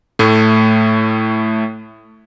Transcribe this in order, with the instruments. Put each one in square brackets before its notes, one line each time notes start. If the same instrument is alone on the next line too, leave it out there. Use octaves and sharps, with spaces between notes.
[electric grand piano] A2 A3